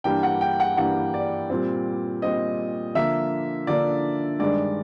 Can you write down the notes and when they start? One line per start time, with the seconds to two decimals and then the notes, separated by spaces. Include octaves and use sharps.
0.04 G2 E3 G3 A#3 D4 G5
0.23 F#5
0.41 G5
0.60 F#5
0.77 G2 E3 G3 A#3 D4 F#5
1.14 D5
1.50 A#2 G3 C4
2.22 A#2 G3 C4 D#5
2.95 D3 F3 A#3 D4 E5
3.67 D3 F3 A#3 D4 D5
4.39 G2 D#3 G#3 D5